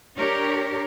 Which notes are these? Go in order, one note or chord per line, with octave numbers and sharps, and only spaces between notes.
D4 G4 A#4 C#5